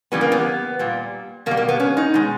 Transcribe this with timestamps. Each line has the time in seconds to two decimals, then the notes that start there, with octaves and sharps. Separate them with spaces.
0.12 C#3 E3 G3 B3
0.21 A#3
0.32 B3
0.79 A#2 G3
1.46 B2 A#3
1.51 G3
1.57 A#3
1.69 B3
1.80 C#4
1.97 D#4
2.14 B2 G#3